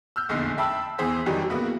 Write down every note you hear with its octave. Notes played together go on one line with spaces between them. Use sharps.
E6 F6 G6
F1 A#1 E2 D3 D#4 C7
E5 G5 A5 B5 E6
E2 E3 G#4 C5 B6
F2 D#3 E3 F#3 G3 D#4
C#3 A#3 B3 E4 F#4